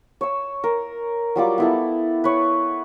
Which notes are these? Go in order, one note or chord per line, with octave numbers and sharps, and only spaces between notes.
C#5 E6
A#4
F#3 G3 F4 D6
B3 E4 A4
B4 C#5